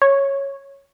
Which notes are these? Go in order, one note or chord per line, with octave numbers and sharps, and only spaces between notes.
C#5